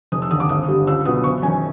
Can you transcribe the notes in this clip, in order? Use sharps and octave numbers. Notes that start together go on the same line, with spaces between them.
F1 D#6
E6
D#2 D3 D#6
D6
G#1 D#6
G2 D3 G3
C#2 E6
B2 F#3 B3 D#6
F#1 C#6
F#2 D#3 G#5